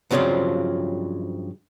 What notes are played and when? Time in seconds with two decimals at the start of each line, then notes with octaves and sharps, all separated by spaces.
0.11 G2 C#3 F3 F#3 C4 F4